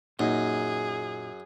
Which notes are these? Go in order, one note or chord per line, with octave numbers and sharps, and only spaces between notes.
F#2 A#2 D#4 G#4